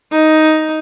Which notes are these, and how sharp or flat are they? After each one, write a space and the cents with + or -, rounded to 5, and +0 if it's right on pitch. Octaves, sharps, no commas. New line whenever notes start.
D#4 +5